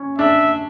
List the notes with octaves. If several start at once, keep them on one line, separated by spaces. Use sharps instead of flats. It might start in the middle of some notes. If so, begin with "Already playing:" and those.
Already playing: C#4
D4 E5